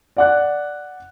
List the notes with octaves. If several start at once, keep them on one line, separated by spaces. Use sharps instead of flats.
D5 F#5 F#6